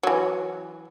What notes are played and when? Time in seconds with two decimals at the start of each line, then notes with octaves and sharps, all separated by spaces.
0.03 E3 F#3